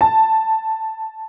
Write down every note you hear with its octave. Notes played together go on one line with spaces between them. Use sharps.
A5